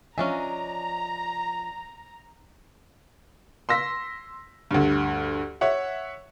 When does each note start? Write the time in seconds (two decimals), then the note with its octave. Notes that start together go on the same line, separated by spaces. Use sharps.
0.18 F3 C#4 D4 D#5 E5 G#5 A#5
3.69 C6 E6 A#6 B6
4.71 D2 G2
5.61 C#5 E5 F#5